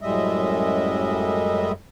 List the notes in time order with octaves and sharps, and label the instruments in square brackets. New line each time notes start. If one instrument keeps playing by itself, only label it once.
[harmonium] F#2 A2 G3 G#3 D#5 E5